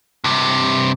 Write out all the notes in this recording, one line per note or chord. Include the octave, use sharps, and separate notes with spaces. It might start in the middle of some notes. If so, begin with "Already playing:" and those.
G2 C3